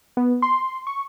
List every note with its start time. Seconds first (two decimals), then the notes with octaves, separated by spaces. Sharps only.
0.17 B3
0.42 C6
0.87 C#6